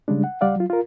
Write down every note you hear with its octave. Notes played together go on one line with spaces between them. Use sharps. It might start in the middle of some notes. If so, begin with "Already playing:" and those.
C#3 G3 G#3 D4
F#5
C#2 G3 D5 F5 F#5
F#3 F4
F4 A#4